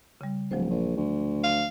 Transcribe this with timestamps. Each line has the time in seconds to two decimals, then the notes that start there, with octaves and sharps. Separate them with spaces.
0.21 C#3 G3
0.51 D1 F3 F#3 C5
0.70 A#1
0.97 D2
1.44 F5